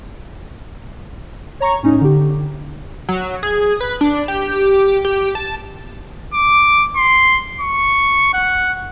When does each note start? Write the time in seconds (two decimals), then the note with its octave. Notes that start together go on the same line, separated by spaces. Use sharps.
1.60 C#5 A#5 C#6
1.83 A2 C#4 D#4
2.01 D3 G4
3.09 F#3
3.43 G#4
3.80 B4
4.01 D4
4.28 G4
5.05 G4
5.35 A5
6.34 D6
6.96 C6
7.60 C#6
8.33 F#5